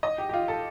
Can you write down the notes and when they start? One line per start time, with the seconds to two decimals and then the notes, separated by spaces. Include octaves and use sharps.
0.03 D#5
0.18 G4
0.29 G4
0.33 F4
0.48 A4